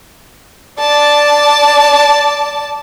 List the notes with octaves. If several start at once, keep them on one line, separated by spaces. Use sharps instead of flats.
D5 A5